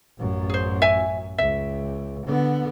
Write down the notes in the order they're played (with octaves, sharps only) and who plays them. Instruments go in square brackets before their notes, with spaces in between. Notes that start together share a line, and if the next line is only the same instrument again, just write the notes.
[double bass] A1 F#2
[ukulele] G#4 C5
E5 G#5
[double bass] C#2 [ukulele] E5
[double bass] D3 B3